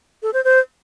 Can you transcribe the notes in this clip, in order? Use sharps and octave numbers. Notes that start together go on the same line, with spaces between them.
A4
C5
C5